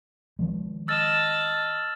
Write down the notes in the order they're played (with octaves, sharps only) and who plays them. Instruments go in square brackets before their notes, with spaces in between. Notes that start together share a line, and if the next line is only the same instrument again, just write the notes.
[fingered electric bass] D#3 F3 G#3
[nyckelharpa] D#5 A5 [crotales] E6 F6 A6